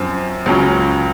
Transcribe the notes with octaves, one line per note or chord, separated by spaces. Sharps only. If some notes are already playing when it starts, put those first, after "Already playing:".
Already playing: F#2 F3 C4
C#2 C#3 F#3 C#4 F4